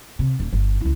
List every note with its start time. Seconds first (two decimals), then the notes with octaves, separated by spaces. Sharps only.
0.19 C3
0.40 D#1
0.53 G1
0.81 C#2 E4